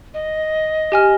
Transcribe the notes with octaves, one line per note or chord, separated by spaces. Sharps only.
D#5
G4 G#5 F6